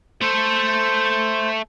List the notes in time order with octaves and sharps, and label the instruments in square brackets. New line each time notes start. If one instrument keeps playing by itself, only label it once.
[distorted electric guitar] A3 A4 [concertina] C5